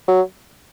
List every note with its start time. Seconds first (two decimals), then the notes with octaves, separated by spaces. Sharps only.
0.08 F#3